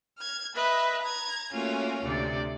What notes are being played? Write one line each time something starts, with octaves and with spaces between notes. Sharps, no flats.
F6 G#6
B4 D#5 E5
A#5 G#6
A3 A#3 C#4 F4 F#4
D2 C3 D5